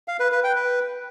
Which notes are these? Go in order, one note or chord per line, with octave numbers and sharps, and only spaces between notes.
F5
B4
B4
G5
B4